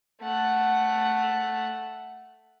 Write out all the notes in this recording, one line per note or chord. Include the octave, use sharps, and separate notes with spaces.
A3 F#5